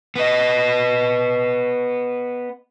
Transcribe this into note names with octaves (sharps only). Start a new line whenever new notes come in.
B3 D#5